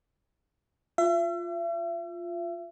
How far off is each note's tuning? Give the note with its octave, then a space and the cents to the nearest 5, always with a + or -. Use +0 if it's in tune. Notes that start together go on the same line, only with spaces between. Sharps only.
F4 +0 E5 +40